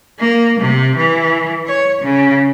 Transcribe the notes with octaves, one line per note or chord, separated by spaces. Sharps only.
A#3
C3
E3
C#5
C#3